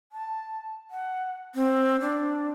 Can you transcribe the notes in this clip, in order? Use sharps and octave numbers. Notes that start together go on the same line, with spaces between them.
A5
F#5
C4
D4